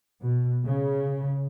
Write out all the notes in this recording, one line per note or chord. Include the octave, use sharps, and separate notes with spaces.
B2
C#3